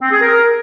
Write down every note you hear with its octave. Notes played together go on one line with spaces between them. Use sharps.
C4
G#4
A#4